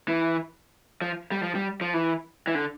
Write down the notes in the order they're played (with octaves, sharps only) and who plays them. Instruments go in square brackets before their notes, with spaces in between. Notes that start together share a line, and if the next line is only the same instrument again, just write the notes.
[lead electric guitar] E3
F3
G3
F3
G3
F3
E3
E3
D3